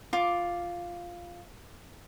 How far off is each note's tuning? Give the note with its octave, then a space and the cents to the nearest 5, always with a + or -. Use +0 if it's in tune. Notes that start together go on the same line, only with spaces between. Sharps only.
F4 +0 D6 +0